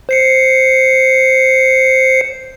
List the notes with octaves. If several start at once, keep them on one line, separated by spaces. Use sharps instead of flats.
C5 C7 C#7